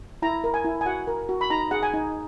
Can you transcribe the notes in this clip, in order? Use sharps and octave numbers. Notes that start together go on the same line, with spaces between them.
E4 A#5
A#4
G#5
E4
G#5
F#4 F#5
A#4
F#4
B5
D#4 A#5
G#4 F#5
G#5
D#4